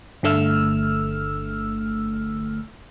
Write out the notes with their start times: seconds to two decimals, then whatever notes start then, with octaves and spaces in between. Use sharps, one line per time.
0.23 G1 D3 A3 E6 F6